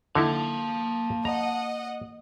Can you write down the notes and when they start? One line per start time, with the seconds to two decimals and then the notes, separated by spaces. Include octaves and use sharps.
0.15 D3 A#3 D#4 E4 F5 A5
1.25 D#5 F#5 A#5